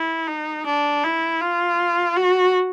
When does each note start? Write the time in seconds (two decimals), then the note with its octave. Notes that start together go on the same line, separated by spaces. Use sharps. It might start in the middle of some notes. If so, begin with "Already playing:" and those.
Already playing: E4
0.27 D#4
0.66 D4
1.03 E4
1.41 F4
2.16 F#4